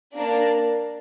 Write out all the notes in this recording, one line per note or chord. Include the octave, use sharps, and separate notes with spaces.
A#3 D4 A#4 D5